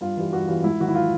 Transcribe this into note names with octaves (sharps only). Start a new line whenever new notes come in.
G2 F4
E3 G3
G2 F#4
E3 G3 F4
G#2 E4
D#3 F#3 F#4
E4
F4